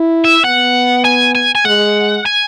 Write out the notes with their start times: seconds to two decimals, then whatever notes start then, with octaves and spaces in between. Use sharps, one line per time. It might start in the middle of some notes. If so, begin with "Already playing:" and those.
Already playing: E4
0.25 E5
0.44 B3 F#5
1.05 G#5
1.35 G#5
1.55 G#5
1.65 G#3 F#5
2.25 G#5